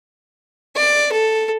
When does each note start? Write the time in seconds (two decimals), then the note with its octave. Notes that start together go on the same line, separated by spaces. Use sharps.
0.76 D5
1.12 A4